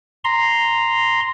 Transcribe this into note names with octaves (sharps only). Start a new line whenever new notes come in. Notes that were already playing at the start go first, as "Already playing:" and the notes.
A#5 C6